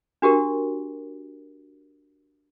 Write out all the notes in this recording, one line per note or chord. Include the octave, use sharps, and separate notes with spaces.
D4 F#4 G4 A#4